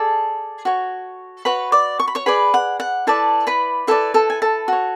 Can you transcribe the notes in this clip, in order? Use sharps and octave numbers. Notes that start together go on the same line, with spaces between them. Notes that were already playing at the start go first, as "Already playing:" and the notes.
Already playing: G#4 A4 D5 A5
F#4 C#5
F#4 B4 C#5 B5
D5 D6
C#6
B5
C#5 C#6
G#4 B4 D5 B5
F#5
F#5
E4 A4 B4 D5 A5
B4 B5
E4 A4 B4 D5 A5
A4 A5
G#5
A4 A5
F#4 C#5